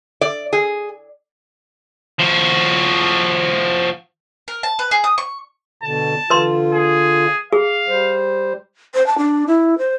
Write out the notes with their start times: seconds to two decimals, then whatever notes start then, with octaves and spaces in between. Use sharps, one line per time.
0.21 D5
0.53 G#4
2.20 F3 F#4
4.48 A#4
4.63 A5
4.79 B4
4.91 G#4
5.04 D#6
5.18 C#6
5.83 B2 D3 A5
6.30 D3 F4 B4 C6
6.74 G#4
7.53 G#4 F5
7.88 G3 C5
8.94 C5
9.07 A5
9.18 D4
9.47 E4
9.78 C5